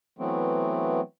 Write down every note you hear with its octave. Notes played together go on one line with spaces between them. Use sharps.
E3 F#3 A3 B3 C4